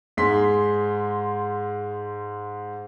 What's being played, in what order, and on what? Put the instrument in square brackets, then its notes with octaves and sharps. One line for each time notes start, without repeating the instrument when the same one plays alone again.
[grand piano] G#2 G#4 C6 B6